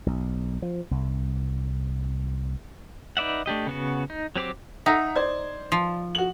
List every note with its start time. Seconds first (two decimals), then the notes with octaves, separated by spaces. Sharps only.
0.06 B1
0.62 F3
0.91 C2
3.17 D#4 B4 D5 E5 F#5
3.46 A3 D4 G4 D#5
3.67 C#3 B3 F#4
4.10 D#4
4.36 F#3 C4 G4 C5 D6
4.86 D#4 E5 F#5 A#5
5.16 C5 D5 G#6
5.72 F3
6.15 F#4 F#7